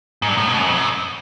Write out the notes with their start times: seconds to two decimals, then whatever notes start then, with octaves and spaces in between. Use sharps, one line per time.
0.22 G#2
0.28 G2
0.37 A2
0.48 B2
0.57 F#2
0.67 F2
0.77 F#2